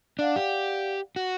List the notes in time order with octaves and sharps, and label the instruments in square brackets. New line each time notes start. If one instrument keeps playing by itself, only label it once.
[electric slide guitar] D4 [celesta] D5 F5 F#5
[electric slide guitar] G4
F#4